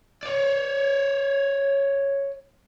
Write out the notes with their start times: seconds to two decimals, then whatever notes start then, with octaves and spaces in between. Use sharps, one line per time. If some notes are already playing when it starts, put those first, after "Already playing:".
0.23 C#5 D5